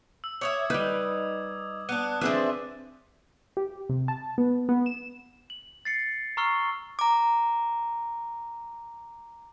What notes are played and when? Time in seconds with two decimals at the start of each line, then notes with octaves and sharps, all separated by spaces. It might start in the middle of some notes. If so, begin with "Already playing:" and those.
0.24 E6
0.41 C#5 D#5 E5 D6 D#6 G#6
0.70 G3 D#4 B4
1.89 B3 D4 F#6 D#7
2.21 F3 C4 D4 G#4 B4 E5 D6 D#7
3.57 G4
3.89 C3
4.08 A5
4.38 B3
4.69 B3
4.86 E7
5.50 F#7
5.85 A6 C7 C#7
6.37 A#5 C#6 E6 F6 C7 G7
6.99 A#5 D6